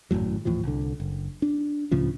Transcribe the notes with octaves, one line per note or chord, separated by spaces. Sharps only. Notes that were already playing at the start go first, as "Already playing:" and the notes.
G#1 F#2 A2 F#3
D#2 A2 E3 F3
C2 D3
F#1
D4
C#2 A2 C#3 F3